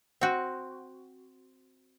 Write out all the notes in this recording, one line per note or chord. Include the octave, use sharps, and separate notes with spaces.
C4 F#4